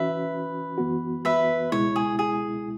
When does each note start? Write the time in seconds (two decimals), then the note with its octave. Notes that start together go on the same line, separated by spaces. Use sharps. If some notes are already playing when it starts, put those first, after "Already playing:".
Already playing: E3 C#4 F#4 B4 E5
0.78 F#2 E3 B3 F#4
1.25 B4 E5
1.72 C#2 B2 G#3 E4 C#5
1.96 G#4
2.19 G#4